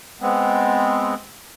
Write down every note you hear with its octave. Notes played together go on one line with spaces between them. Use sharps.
G#3 B3 C4